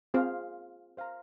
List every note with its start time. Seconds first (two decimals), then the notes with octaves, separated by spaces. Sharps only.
0.14 C4 F4 G#4 C5 F5
0.97 C5 F5 A#5